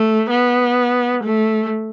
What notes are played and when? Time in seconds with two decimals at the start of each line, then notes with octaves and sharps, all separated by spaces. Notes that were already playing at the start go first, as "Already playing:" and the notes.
Already playing: A3
0.30 B3
1.24 A3